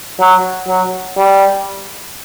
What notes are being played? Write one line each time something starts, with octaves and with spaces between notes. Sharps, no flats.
F#3
F#3
G3